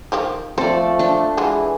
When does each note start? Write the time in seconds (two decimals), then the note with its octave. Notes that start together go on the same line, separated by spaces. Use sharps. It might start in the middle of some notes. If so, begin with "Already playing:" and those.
0.12 D#3 F3 G4
0.58 F3 A3 C4 A4 C5 D5
0.99 D4 G5
1.37 E3 G#3 F4 F#4 G#4